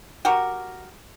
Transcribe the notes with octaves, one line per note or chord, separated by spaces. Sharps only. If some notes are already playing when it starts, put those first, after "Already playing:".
F#4 G4 A#4